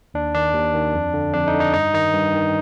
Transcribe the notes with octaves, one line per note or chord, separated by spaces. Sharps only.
D#2 D4
D#3 D4
D#2
D#3
F2
D3
F2 D4
D#4
D3
D#4
G2 D#4
D#3 D#4
G2
D#3